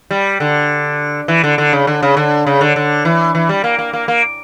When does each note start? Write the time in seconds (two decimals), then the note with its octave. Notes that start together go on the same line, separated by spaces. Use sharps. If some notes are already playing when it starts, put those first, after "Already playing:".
0.11 G3
0.40 D3
1.28 E3
1.44 D3
1.58 D3
1.73 C#3
1.87 D3
2.03 C#3
2.17 D3
2.47 C#3
2.61 D3
2.76 D3
3.05 E3
3.35 E3
3.49 G3
3.64 A#3
3.79 A#3
3.93 A#3
4.08 A#3